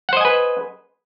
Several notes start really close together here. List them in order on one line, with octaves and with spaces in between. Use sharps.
F#5 C5 D#5 G#5 B4